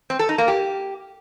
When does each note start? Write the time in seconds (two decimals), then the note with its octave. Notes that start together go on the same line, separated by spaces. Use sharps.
0.10 C4
0.19 A4
0.29 D#4
0.38 A#3
0.48 G4